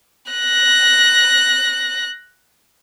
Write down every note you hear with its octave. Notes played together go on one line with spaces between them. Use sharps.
F#6 A#6